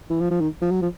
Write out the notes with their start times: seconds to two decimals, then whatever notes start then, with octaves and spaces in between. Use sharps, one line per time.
0.10 E3
0.21 F3
0.31 F3
0.41 D#3
0.62 F3
0.71 F#3
0.82 F3